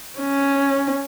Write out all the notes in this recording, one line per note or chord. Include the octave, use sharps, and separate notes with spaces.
C#4